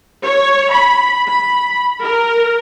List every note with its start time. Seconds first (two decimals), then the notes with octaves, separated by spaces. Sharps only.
0.23 C#5
0.71 B5
1.27 B5
2.02 A#4